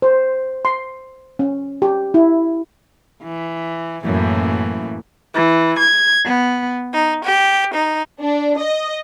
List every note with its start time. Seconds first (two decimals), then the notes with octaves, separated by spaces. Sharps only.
0.02 C5
0.65 C6
1.39 C#4
1.82 G4
2.14 E4
3.23 E3
4.03 F#2 A2 E3 A#3
5.34 E3
5.78 G#6
6.24 B3
6.93 D#4
7.25 G4
7.75 D#4
8.21 D4
8.57 D#5